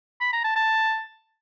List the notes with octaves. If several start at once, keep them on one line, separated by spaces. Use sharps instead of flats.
B5
A#5
A5
A5